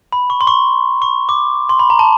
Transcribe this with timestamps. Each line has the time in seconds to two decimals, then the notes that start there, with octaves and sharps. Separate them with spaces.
0.12 B5
0.30 C#6
0.41 C6
0.47 C#6
1.02 C#6
1.29 D6
1.69 C6
1.79 B5
1.90 A#5
1.99 A5